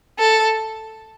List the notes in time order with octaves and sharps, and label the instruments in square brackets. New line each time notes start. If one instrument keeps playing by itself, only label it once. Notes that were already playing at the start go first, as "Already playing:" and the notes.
[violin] A4